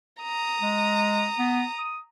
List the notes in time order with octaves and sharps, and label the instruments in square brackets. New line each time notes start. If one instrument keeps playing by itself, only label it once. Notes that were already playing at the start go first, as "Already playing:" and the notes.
[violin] A#5 D#6
[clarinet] G#3
B3
D#6